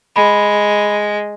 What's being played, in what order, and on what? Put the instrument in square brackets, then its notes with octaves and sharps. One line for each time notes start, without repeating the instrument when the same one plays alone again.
[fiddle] G#3 [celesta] B5